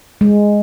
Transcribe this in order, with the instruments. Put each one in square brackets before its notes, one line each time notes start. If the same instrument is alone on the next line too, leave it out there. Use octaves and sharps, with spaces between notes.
[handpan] G#3